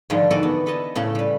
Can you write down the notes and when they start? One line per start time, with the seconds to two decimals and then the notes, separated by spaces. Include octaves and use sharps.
0.10 G#2 D3 D#3 F3 G3 A3
0.31 E3 F#4 A4 B4 D5 G#5
0.43 B3
0.66 A4 B4 C#5 D#5 A5
0.95 A2 C#3 A3 A5
1.15 G3 B4